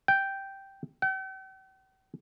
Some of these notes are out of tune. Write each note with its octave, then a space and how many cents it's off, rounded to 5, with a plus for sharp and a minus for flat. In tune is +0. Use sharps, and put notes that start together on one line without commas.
G5 -5
G5 -45